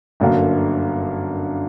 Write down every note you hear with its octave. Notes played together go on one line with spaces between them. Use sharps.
G1 F#2 D3 A#3